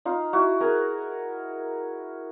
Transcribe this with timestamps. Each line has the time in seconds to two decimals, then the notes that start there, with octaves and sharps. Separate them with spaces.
0.05 D#4 F4
0.33 E4 F#4
0.60 G#4 A#4